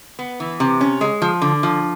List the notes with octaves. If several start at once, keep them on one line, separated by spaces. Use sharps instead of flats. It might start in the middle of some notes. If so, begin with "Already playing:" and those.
B3
E3
C3
C#4
G#3
F3
D3
F3